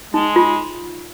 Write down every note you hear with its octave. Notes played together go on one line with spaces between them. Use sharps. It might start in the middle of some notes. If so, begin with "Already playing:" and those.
G#3 D#4
F4